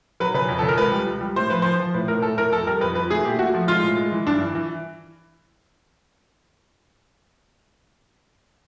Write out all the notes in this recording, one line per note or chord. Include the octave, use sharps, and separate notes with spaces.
F#3 B4
C#3 B4
F2
C#3 A4
A#4
C#2 B4
G3
C#2
G3
A2 C5
F3 B4
F3 C5
F3
A2 B4
A2 A#4
A2 A4
A2 A#4
F2 A4
G3 A#4
F2 B4
F2 B4
A3 G#4
A#2 G4
A3 F#4
F3
G#3 F4
A2
G#3
E3
G2 D4
E3
E3